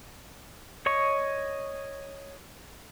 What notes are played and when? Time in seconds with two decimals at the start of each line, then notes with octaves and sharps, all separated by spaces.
0.86 C#5 D#5 C#6